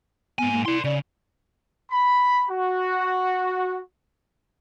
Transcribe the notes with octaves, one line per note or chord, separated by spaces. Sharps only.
G#2 B3 G#5
A#3
E4 D5 C6
C#3 D5
B5
F#4